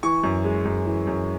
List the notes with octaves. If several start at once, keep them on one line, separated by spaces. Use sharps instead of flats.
E3 C#6
F#2
G#3
F#2
E3
F#2